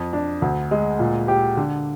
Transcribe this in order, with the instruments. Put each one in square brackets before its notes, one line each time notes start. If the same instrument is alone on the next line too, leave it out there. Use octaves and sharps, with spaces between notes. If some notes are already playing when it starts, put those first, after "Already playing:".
Already playing: [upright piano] F2
D4
D2
G#3
A#2
G4
D3